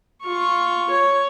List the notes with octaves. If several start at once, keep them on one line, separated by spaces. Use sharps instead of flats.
F4 C#6
C#5